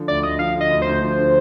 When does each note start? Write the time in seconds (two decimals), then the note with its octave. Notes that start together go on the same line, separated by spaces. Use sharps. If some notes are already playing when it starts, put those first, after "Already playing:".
Already playing: D3 F3
0.08 D2 D5
0.23 D2 D#5
0.39 F3 F5
0.55 D3
0.61 D#5
0.71 D2
0.82 D2 C5
1.02 F3
1.18 D3